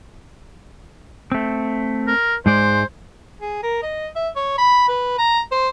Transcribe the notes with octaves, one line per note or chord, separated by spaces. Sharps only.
A3 C4
A#4
G#2 G#3 C5 D5
G#4
A#4
D#5
E5
C#5
B5
B4
A#5
C5